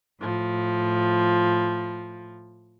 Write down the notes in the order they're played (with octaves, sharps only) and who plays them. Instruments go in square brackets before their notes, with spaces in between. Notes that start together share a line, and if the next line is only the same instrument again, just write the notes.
[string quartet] A2 F3